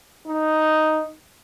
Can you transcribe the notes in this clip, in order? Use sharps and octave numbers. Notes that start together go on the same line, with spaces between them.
D#4